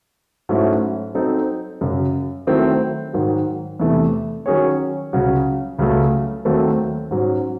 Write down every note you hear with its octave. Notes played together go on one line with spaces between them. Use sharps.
G#2 F#3 A3 C#4 E4
F#3 C4 D#4 A4
F#2 C#3 F#3
D#3 F#3 A3 C4 E4
G#2 D#3 F#3
E2 C3 E3 A3
D#3 F#3 C#4 G#4 C#5
C#2 C#3 F#3 C#4 F#4
C#2 C#3 F#3 A3
D#2 D#3 F#3 A3 C4
G#2 F#3 C#4